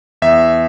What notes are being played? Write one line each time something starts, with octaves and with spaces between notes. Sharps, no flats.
E2 E5